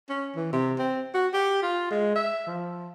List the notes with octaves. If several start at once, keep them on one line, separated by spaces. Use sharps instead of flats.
C#4
E3
C3
C4
F#4
G4
F4
G#3
E5
F3